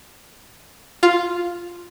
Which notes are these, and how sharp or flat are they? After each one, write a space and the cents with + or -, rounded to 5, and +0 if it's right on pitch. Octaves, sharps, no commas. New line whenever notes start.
F4 +0